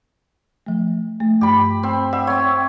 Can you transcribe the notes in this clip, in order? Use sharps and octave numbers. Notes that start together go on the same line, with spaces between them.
F3 A3
A3
G2 G4 B5
C4
E5 F#5
C4 C#5 F#5